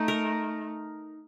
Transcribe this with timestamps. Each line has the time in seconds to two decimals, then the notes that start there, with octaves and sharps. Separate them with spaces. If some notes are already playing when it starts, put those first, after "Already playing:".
Already playing: A3 D#4
0.08 A#4